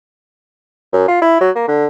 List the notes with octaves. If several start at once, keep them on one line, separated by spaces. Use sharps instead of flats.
F#2
F4
E4
F#3
A#3
D3